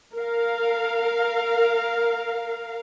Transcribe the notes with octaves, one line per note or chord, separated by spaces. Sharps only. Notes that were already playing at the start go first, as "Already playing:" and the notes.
A#4 F5